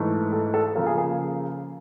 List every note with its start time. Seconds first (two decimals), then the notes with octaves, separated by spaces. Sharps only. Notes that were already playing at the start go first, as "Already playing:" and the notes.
Already playing: G#2 E3 A3
0.32 A4
0.54 A4
0.76 C#3 F3 A#3 A4
0.86 G#4
0.98 G#4